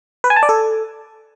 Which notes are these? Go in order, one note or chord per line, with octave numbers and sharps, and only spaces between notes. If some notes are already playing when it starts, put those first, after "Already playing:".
B4
G#5
A5
D5
A4